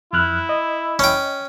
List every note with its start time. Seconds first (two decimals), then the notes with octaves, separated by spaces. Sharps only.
0.13 F2 E4 F6 F#6
0.49 D#5
0.99 C#4 G5